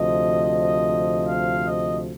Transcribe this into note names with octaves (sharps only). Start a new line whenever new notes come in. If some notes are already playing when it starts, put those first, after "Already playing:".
Already playing: D2 C3 F3 D#5
F5
D#5